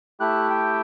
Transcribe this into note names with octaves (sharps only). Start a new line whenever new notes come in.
A3 E4 G4 F#6
G5